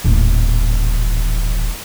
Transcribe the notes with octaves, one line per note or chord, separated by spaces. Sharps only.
D#1 A1